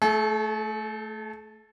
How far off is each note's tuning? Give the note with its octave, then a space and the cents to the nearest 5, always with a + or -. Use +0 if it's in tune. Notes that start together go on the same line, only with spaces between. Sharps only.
A3 +0 A4 -45